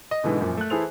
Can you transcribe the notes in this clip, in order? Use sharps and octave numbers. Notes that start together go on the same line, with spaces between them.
D#5
G#2 B2 D3 E3 G#3
F#2 A#2 F3
A3 F#6
E3 E4 G#4 A4 C5 F7